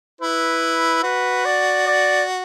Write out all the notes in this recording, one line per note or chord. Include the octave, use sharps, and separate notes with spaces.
E4 B4
F#4 B4
D5
D5